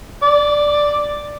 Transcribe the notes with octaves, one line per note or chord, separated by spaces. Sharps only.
D5